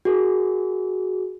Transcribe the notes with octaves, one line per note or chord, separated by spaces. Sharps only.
F#4 G#4 A#4